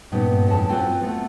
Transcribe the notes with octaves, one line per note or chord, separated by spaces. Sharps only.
G2 A#2 B3 C#4 D#4
F2 A#2 G#3 C#4 E4 A5
C4 F4 F#4 B4
A3 B3